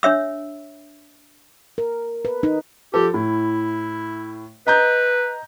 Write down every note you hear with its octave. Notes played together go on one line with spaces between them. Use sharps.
D4 C#5 E5 E6
A#4
B4
D#4
F3 G4 A4
A2 E4
B4 D#5 A#5 G6